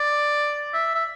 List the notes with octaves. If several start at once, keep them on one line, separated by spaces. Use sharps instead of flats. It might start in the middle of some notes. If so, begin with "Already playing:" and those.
Already playing: D5
E5
E5